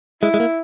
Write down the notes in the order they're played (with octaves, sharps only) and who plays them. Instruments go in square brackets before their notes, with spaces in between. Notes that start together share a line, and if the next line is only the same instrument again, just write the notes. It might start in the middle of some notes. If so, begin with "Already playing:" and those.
[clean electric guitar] G#3 [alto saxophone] E4
[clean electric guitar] G#3
A#3